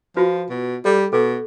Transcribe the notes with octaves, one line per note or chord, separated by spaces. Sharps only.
F3 F4 F#4 B4
B2
G3 A4
B2 A4